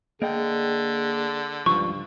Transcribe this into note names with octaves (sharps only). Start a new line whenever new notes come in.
D3 A#3 G#4 D#5 G5
C#2 G2 F3 C#6